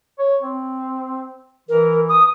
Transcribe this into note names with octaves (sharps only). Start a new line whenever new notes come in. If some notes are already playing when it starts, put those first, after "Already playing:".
C#5
C4
E3 A#4
D#6